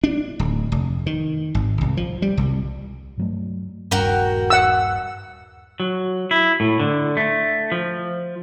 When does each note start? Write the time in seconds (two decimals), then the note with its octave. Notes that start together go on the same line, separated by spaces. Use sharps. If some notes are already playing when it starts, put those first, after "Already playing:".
0.04 D4
0.39 D1
0.72 F1
1.06 D#3
1.55 G#1
1.81 C2
1.97 F3
2.22 G3
2.37 C2
3.17 G2 F#3 A3
3.91 D#1 G2 F#4 A#4 G5
4.50 F#5 E6
5.80 F#3
6.31 E4
6.60 A2
6.80 D3
7.17 A3
7.72 F3